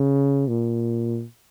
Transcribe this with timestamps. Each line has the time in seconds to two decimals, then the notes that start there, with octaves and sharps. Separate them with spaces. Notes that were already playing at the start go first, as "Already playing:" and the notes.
Already playing: C#3
0.48 A#2